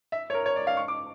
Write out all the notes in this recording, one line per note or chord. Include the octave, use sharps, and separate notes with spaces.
E5
C#5
A#4
C#5
D5
F5
C#6
D6